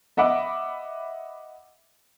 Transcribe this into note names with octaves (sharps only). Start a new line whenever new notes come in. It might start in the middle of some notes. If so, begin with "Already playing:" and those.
D#5 E5 F#5 B5 D6